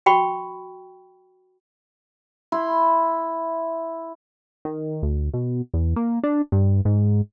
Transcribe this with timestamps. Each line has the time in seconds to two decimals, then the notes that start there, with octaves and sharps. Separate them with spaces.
0.06 F#4 G5 B5 C#6
2.52 E4 B5 C6
4.65 D#3
5.03 D2
5.34 B2
5.74 E2
5.96 A#3
6.23 D4
6.52 G2
6.85 G#2